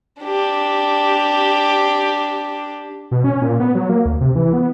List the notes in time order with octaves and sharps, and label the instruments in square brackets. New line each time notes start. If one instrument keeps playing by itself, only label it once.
[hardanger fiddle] D4 G4
[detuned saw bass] B2
C#4
A#2
B3
F#3
A#3
D2
C3
E3
B3